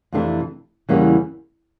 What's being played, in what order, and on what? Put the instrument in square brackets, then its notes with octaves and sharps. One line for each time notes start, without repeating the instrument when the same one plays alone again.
[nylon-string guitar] F2 C3 E3 A3 D4
E2 C#3 E3 G3 A#3